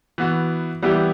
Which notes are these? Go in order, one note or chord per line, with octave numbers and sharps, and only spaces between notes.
E3 B3 F#4
E3 G3 B3 E4 G4